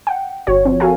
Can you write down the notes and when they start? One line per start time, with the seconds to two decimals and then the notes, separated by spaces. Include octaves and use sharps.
0.07 F#5 G5
0.47 G1 F#4 C#5
0.65 F3 C4
0.80 F#4 A4 A#4 F5 G#5